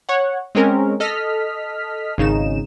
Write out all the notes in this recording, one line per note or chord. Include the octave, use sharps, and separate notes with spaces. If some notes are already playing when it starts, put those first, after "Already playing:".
C#5 F#5
G#3 C4 C#4 A#4
A4 D#5 F6 B6
G#1 C#3 D#4 E7